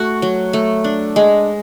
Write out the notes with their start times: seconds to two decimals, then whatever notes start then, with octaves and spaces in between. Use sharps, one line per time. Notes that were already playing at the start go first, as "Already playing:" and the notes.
Already playing: A3 F#4
0.22 F#3
0.53 A3
0.84 D4
1.16 G#3